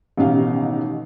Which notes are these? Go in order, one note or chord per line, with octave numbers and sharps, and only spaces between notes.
A1 B2 D#3 D#4 G4 F5